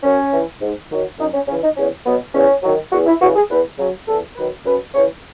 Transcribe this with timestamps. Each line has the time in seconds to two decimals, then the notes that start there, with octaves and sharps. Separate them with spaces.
0.03 F#2 C#4
0.33 E3
0.61 G#2
0.91 D#3 F#3
1.19 F#2 D#4
1.33 C#4
1.48 C#3 E3 C#4
1.63 D#4
1.77 E2 C#4
2.05 B2 F#3 B3
2.34 E2 C#4
2.63 D#3 F#3
2.92 E2 F#4
3.06 E4
3.21 C#3 E3 F#4
3.36 G#4
3.49 E2 B4
3.78 C#3 F#3
4.08 E2 A4
4.36 D#3 F#3 B4
4.66 F#2 B4
4.94 C#3 E3 C#5